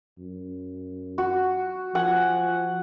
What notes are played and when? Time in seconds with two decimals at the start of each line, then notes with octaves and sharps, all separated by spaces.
0.18 F#2
1.18 F#4
1.95 F3 F#5 G#5